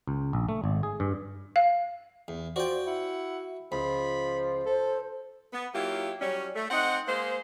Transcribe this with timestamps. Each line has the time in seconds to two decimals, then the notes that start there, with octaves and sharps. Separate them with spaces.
0.08 C#2
0.33 A#1
0.49 A3
0.64 G#1
0.83 G#4
1.00 G2
1.56 F5
2.28 E2
2.56 F3 F#4 D5 G5
2.87 E4 F#5
3.72 C#2 F3 B5
4.66 A4 C5
5.53 B3
5.74 F#3 A#3 E4 F4 G4
6.21 F#3 G3 C#4
6.56 A3
6.70 C4 D#4 F#5
7.08 G#3 A#3 C5